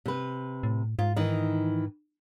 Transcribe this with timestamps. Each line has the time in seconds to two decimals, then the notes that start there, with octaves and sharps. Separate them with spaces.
0.06 C3 B4
0.63 A2
0.99 G#2 F4
1.16 D#3 E3 D#4